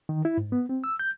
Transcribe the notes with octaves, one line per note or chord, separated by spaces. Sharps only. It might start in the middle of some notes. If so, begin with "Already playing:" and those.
D#3
E4
G#2
B3
C4
E6
G6